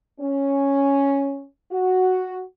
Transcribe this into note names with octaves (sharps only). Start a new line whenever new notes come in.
C#4
F#4